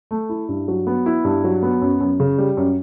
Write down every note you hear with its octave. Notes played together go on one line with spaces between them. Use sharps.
A3
E4
G2
F#3
B3
E4
G2
F#3
B3
F#2
F#2
C#3
G3
F#2